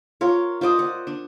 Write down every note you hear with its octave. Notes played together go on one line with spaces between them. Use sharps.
F4 A#4 C#5
F4 C5 D5 D#5
F#5
D4